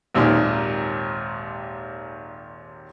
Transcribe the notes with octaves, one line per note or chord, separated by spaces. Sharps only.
G#1 D#2 A#2 D#3